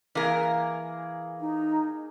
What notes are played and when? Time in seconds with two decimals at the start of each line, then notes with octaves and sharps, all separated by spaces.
0.15 E3 A#3 G#4 A#4
1.40 D#4